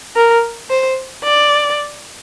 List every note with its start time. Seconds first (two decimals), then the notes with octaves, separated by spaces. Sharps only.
0.16 A#4
0.70 C5
1.24 D5